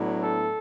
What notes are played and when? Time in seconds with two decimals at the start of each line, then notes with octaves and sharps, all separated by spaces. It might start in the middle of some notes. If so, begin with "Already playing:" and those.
Already playing: A2 F#3 B3 D4
0.21 A4